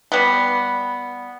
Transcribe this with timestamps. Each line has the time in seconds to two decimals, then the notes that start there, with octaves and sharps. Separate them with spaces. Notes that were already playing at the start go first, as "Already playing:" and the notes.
0.12 G3 B3